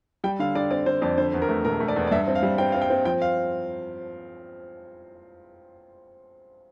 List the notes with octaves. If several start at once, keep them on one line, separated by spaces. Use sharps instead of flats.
G3 G5
D3 F5
D3 D5
C4 D5
D3 C5
F2 D5
D3 C5
E2
A#4
A3
E1 A#4
A3
D5
E2
D5
G2 E5
C4
F5
G3
C4 G5
C4 F5
G5
C4
F3 G5
F5